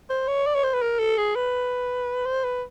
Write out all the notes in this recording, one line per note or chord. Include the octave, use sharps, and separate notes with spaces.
C5
C#5
D5
C#5
C5
B4
A#4
A4
G#4
B4
C5
B4